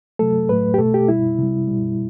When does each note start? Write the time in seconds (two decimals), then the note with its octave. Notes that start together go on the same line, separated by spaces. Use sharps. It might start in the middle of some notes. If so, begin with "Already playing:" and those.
0.19 C3 F#3 A3 A4
0.49 A2 F#3 A3 B4
0.74 G4
0.79 B2 A3 A4
0.94 G4
1.08 B2 G3 E4
1.38 C3 G3
1.68 B2 G3